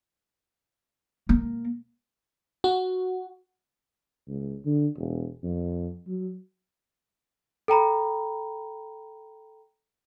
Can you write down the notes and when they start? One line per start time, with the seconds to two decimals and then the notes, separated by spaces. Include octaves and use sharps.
1.29 A#3
2.64 F#4
4.28 C#2
4.65 D3
4.97 E1
5.43 F2
6.08 F#3
7.68 A4 G5 A#5 B5